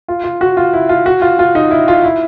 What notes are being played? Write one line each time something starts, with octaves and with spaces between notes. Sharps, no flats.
F4
F4
F#4
F4
E4
F4
F#4
F4
F4
D#4
E4
F4
E4